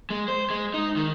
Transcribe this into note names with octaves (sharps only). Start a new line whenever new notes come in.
G#3
C5
G#3
D#4
D#3